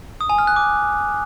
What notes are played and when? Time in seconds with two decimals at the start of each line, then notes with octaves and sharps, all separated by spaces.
0.21 D#6
0.29 G#5
0.38 F6
0.47 F#6
0.56 D6